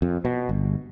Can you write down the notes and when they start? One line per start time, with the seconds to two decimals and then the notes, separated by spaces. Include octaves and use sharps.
0.02 F2
0.25 B2
0.49 G1